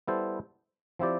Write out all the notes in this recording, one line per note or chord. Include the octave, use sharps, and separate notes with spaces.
G3 B3 E4 A4 C5
F3 C4 E4 G4 D5